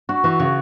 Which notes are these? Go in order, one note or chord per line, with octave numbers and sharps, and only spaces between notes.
D4 F#4
E3 F#4
C#3 F#4